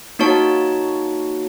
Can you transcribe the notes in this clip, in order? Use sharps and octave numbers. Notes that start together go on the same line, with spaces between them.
A#3 D#4 F#4 C#5 A5